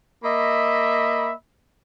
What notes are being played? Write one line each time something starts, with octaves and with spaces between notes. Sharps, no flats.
A#3 D#5 E5 B5